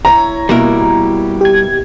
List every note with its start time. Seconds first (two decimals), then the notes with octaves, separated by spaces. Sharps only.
0.05 E4 C#5 A#5
0.49 B2 G3 A#3 E4 F#4 A#4
1.41 G4 G#6